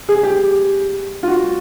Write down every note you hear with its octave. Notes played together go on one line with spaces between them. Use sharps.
G#4
G4
F4
F#4